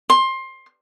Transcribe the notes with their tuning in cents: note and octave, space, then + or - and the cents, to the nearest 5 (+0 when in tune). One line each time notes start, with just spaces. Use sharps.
C6 +20